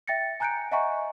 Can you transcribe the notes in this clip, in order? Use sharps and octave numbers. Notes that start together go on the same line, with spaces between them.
E5 G5 A6 A#6 C#7
G#5 A#5 F#6 G6 C#7 D7
D#5 E5 F#5 G#5 A#5 C#6